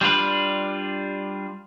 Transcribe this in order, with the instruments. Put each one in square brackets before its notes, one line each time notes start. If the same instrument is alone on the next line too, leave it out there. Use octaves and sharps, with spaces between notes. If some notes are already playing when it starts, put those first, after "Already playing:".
[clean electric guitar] G3 D4 F4 B4